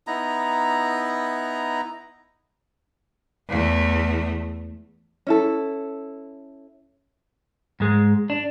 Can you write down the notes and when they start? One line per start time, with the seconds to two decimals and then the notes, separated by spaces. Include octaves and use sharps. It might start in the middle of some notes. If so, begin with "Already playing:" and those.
0.07 B3 D#4 E4 A#5
3.50 E2 A3
5.27 C#4 E4 A4
7.80 G#2 G#3
8.30 D4